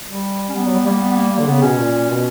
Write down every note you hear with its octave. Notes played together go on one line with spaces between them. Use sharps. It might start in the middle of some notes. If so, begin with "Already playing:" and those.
G3
C#4
G3 B3
F#3
G3
G3 A#3
B3
B3
A#3
A#3
D3
C#3 B3
B2 C#4
A#2
B2